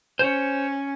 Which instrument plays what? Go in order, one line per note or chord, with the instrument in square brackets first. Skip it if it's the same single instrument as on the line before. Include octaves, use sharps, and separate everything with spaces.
[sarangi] C#4 [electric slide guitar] C5 C#5